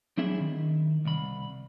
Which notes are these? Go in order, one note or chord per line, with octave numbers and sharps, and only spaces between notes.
F#3 C4 D4 E4 G#4 E5
D#3
C2 B5